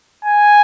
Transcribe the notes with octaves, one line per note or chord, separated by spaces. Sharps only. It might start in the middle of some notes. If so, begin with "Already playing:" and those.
G#5